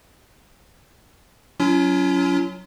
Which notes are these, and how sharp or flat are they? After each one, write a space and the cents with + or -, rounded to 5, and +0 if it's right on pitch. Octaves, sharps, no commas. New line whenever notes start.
F#3 +0 C#4 +30 F4 -40